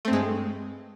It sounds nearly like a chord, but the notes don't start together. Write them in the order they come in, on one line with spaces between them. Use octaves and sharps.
A3 C4 G2 G#3